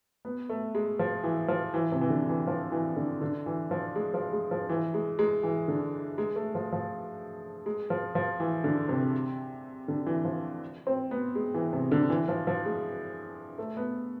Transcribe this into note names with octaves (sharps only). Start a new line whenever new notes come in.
B3
A3
G#3
F3
E3
F3
E3
C3
E3
D3
E3
F3
E3
D3
D3
E3
F3
G#3
F3
G#3
F3
E3
G#3
G#3
E3
D3
G#3
A3
F3
F3
G#3
F3
F3
E3
D3
C3
D3
E3
F3
C4
B3
G#3
E3
C3
D3
E3
F3
F3
G#3
A3
B3